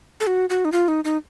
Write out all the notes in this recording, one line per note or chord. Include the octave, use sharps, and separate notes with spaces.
A4
F#4
F#4
D#4
F4
D#4
D#4